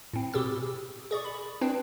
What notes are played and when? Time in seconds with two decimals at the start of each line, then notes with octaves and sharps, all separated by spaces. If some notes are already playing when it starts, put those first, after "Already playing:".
0.13 A2 C4
0.33 B2 G4 G#4 E6 A6
1.11 G#4 D5 C#6
1.24 B5
1.61 C4 D4 B4